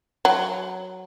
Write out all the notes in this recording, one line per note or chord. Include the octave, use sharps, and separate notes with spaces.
F#3